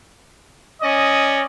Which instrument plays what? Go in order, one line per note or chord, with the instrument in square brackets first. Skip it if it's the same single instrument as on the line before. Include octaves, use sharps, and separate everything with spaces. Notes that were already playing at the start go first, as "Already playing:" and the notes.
[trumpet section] C#4 D5 D#5